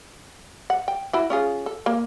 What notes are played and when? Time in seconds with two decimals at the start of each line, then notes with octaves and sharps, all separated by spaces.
0.70 F#5
0.88 G5
1.13 E4 F#4
1.30 C#4 F4 G#4
1.66 A4
1.86 A#3